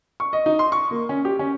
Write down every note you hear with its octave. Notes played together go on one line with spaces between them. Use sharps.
C#6
D#5
D#4
C6
C#6
A#3
C#4
G4
C#4